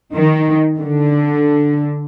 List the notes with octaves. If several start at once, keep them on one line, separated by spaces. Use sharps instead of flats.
D#3
D3